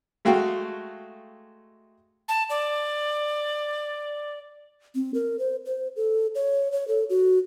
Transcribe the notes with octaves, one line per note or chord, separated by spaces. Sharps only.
G#3 A3 F#4 F5 G5
A5
D5
C4
A#4
C5
C5
A4
C#5
C#5
A4
F#4